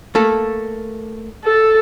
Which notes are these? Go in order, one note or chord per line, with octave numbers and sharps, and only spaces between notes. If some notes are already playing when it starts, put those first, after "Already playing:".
A3 A#3 A4
A4